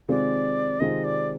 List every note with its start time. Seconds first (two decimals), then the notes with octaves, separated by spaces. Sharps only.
0.09 C3 D#3 G#3 C4 F4 D5
0.80 C3 D#3 G#3 C4 F4 D#5
1.04 D5